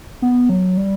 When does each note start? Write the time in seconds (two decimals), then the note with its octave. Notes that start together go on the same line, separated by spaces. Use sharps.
0.22 B3
0.49 F#3
0.77 G3